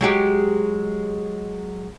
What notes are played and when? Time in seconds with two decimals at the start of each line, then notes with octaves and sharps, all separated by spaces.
0.01 F#3 G#3 G4